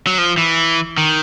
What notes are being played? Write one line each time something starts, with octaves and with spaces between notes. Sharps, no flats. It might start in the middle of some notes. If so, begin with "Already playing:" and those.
F#3
F3
E3
D#3